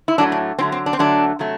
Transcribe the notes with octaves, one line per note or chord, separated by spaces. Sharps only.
E4
A2 F#3 A3 D4
D4
D3 F#3 A3 C4
C4
D4
C4
D3 F#3 A3 D4
C3 F#3 A3